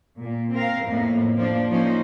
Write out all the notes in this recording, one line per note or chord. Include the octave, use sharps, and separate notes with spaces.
A#2
C4 A#4 F5
F2 A2 A#3 B3
F3 A#3 D4
F3 A#3 C#4 D#4 C5